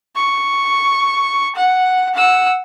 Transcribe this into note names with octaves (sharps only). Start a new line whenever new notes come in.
C#6
F#5
F#5 E6